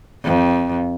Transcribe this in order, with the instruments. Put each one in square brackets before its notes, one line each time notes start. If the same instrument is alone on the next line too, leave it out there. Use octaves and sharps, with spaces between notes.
[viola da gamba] F2